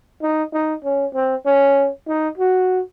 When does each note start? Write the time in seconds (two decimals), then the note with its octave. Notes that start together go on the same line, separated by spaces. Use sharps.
0.22 D#4
0.53 D#4
0.84 C#4
1.14 C4
1.46 C#4
2.07 D#4
2.38 F#4